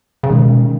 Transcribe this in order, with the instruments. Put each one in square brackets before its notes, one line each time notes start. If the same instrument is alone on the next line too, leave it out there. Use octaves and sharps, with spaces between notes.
[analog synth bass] C#3
[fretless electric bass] B2 G#3 C#4 [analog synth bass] D#3